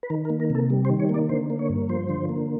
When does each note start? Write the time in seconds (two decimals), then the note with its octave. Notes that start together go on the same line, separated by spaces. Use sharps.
0.03 B4
0.10 D#3 A#4
0.25 A#4
0.30 A#3
0.40 A#4
0.50 C3 A4
0.70 G3
0.85 C5
0.90 D#3
1.00 C#5
1.09 A#3 D5
1.29 D3 C5
1.50 A#3
1.59 C#5
1.69 G2
1.89 F3 C5
2.09 D3
2.29 A#3